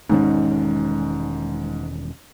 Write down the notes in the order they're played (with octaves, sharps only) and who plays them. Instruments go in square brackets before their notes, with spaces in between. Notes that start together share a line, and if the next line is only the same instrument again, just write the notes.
[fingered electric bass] E1 D#3 C#4 [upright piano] G#2